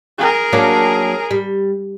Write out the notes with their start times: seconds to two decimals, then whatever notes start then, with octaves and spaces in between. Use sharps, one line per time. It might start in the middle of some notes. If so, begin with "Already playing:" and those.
0.18 G#4 A#4
0.53 F#3 A#3 D4
1.31 G3